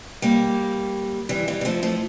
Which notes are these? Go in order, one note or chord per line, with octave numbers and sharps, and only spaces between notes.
G3 A#3
E3 G3
E3 G3
G3
F3 A3
F3 A3